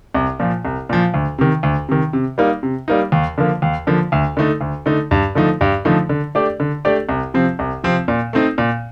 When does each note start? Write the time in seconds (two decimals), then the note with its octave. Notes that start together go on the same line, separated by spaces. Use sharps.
0.15 C2
0.39 A#2 F3
0.65 C2
0.89 A#2 F3
1.14 D2
1.38 C3 D#3
1.63 D2
1.89 C3 D#3
2.13 C3
2.38 G3 A#3 D#4
2.63 C3
2.88 G3 A#3 D#4
3.12 D#2
3.38 D3 F3 A#3
3.62 D#2
3.87 D3 F3 A#3
4.12 D2
4.37 D3 A3 D#4
4.61 D2
4.86 D3 A3 D#4
5.11 G2
5.35 D3 F3 A3 D#4
5.61 G2
5.85 D3 F3 A3 D#4
6.09 D3
6.35 A3 D4 G4 D5
6.60 D3
6.85 A3 D4 G4 D5
7.09 C2
7.34 C3 F3 C4
7.59 C2
7.83 C3 F3 C4
8.08 A#2
8.33 A3 C4 D#4
8.58 A#2